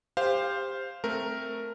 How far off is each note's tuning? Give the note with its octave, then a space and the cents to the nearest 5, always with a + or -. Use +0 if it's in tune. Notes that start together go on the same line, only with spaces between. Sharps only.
G4 +25 C5 +0 F5 +0
A3 +0 C4 +0 A#4 +0